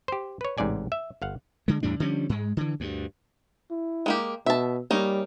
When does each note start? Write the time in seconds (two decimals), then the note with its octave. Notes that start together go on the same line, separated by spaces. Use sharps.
0.08 G4 C5
0.41 B4 C#5
0.58 A1 G#2 C3 D5 G#5
0.92 E5
1.22 G1 F5 F#5
1.68 D3 G#3
1.83 E2 A2 G3 D4
2.00 D3 F3 G3 C#4
2.29 G#2 G#3
2.57 D3 E3
2.80 D2 G2
3.71 E4
4.06 G#3 A#3 G4
4.46 B2 E5 A5
4.91 G3 A#3 C#4 D#4